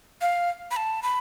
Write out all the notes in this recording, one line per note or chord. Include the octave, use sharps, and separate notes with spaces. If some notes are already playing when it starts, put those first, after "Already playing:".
F5
B5
A5
B5